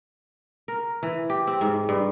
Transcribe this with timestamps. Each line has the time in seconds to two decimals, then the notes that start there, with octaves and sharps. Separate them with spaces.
0.68 A#4
1.03 E3
1.30 G4
1.47 C4
1.61 G#2
1.89 G2